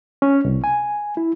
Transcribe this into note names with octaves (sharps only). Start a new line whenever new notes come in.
C#4
C2
G#5
E4